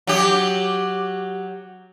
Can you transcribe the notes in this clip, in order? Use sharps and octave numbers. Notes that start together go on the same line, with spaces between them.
F#3 G4